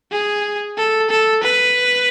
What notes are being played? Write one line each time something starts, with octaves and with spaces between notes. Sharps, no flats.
G#4
A4
A4
B4